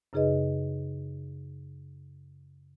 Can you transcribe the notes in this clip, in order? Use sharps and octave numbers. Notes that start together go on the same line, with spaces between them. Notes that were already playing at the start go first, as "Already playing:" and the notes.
F#2 C#3 D#4 G#4 B4 D#5